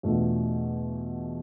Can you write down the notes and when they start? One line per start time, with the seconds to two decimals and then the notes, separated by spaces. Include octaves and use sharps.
0.03 E2 B2 A3 D4 F4